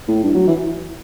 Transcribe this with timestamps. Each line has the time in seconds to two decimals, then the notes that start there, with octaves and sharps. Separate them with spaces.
0.08 A2
0.23 G2
0.34 F#3
0.47 E3